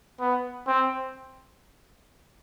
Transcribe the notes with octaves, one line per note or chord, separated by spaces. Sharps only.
B3
C4